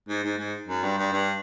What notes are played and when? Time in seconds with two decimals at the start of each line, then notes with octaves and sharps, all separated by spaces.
0.09 G#2
0.24 G#2
0.38 G#2
0.68 F#2
0.83 G2
0.98 G2
1.12 G2